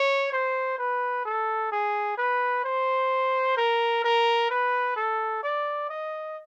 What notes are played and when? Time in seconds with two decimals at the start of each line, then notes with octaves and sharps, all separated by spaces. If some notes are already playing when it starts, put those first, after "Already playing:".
Already playing: C#5
0.33 C5
0.78 B4
1.25 A4
1.72 G#4
2.18 B4
2.64 C5
3.57 A#4
4.04 A#4
4.51 B4
4.96 A4
5.43 D5
5.89 D#5